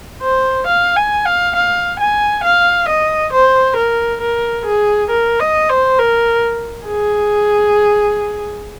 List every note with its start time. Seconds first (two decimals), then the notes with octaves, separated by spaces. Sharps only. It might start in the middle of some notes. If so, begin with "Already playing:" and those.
0.22 C5
0.67 F5
0.96 G#5
1.26 F5
1.55 F5
1.99 G#5
2.43 F5
2.88 D#5
3.32 C5
3.76 A#4
4.21 A#4
4.65 G#4
5.10 A#4
5.39 D#5
5.69 C5
5.99 A#4
6.87 G#4